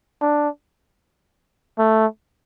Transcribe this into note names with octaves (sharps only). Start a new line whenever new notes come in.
D4
A3